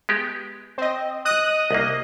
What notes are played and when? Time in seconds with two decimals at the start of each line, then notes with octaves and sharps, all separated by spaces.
0.09 G#3 B3 G4
0.78 C4 D#5
1.25 D#5 D#6 F#6
1.71 C2 A#3